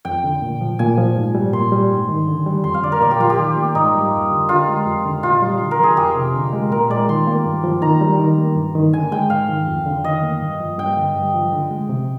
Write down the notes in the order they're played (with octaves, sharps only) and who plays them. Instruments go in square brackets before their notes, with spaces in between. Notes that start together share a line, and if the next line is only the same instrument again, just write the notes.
[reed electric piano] F2 [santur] G5
[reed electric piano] D3
A#2
F3
[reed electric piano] A#2 [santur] G#5
[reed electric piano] F3
G#2
G3
[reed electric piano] A#2 [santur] C6
[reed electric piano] G3
G#2
D#3
D3
G3
[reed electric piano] F2 [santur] C6
[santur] F5
[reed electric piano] D3 [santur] D5
[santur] A#4
[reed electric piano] A#2 [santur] D5
[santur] G4
[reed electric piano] F3 [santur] F4
[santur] G4
[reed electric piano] D#3
A#3
[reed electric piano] G#2 [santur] D#4
[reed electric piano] G3
F2
D3
[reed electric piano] D3 [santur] F4
[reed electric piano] G#3
F2
D3
[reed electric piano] A#2 [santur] F4
[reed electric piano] G3
D3
[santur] A#4
[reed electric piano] F3 [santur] G#4
[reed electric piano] F2 [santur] G4
[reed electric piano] C3
D3
G#3
[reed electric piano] A#2 [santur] A#4
[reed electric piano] G#3 [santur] D5
[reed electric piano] D#3 [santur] C6
[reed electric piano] A#3
G2
F3
[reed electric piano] D#3 [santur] A#5
[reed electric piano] G3
D#3
A#3
G2
D#3
[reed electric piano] D3 [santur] G#5
[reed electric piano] G#3 [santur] G5
[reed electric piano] G#2 [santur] F5
[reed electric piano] D#3
F2
D3
[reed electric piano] D#3 [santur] D#5
[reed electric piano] A#3
G2
F3
[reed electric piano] G2 [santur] G5
[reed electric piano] D3
G2
F3
D3
G#3
C3